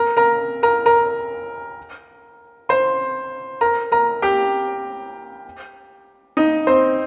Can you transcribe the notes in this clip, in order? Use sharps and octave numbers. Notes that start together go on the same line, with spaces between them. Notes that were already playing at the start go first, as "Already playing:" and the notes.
Already playing: A#4 A#5
A#4 A#5
A#4 A#5
A#4 A#5
C5 C6
A#4 A#5
A#4 A#5
G4 G5
D#4 D#5
C4 C5